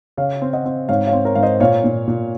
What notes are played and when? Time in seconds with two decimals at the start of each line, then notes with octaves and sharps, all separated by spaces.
0.17 C#3 C#5 F5
0.42 C4
0.53 D#5 F#5
0.65 C4
0.89 G#2 C#5 F5
1.07 C#5 F5
1.13 C4
1.25 A#4 C#5
1.35 G#2 F5
1.42 C5 D#5
1.60 A#2 C#5 F5
1.84 A#2
2.08 A#2